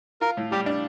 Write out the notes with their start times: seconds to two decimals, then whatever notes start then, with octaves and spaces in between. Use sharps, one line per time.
0.21 F4 A#4
0.37 A2
0.52 G3 G4
0.66 D4